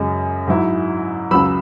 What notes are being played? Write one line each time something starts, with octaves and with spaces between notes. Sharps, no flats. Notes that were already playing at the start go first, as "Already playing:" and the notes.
Already playing: F#2 C#3 G#3
G#2 F#3 E4
C#2 C#3 F#3 B5 E6